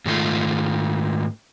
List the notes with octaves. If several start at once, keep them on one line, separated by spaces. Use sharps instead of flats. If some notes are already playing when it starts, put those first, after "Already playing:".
G#2 D#3 A3 F4